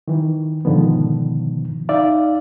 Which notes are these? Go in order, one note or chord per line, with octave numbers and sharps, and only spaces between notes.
D#3 E3
G#2 B2 D3 D#3 F3 B3
D#4 D5 E5 F5